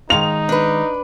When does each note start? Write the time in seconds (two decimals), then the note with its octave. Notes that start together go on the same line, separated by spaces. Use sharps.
0.10 D#3 G#3 D#4 F5 F7
0.49 D4 B4